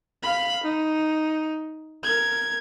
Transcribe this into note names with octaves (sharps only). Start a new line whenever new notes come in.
F5 B5
D#4
A#4 G#6